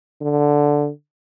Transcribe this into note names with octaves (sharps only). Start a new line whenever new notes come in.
D3